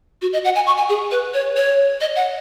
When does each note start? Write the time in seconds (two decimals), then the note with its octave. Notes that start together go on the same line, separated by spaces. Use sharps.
0.22 F#4
0.33 D#5
0.44 F#5
0.56 G#5
0.67 C#6
0.77 G#5
0.89 G#4
1.11 B4
1.34 C#5
1.56 C#5
2.01 D#5
2.16 F#5